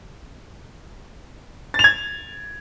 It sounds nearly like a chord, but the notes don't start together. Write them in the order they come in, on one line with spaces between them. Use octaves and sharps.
A6 F7 G#6